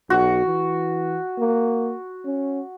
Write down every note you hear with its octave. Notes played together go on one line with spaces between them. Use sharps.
B1 F#4
E3
A#3
C#4